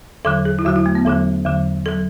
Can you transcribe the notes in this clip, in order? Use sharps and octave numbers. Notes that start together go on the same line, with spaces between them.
E2 D3 F#3 A4
G#4
E4
E2 D3 F#3 F#4
E4
A3
B3
E2 D3 F#3 A4
E2 D3 F#3
F#3 A4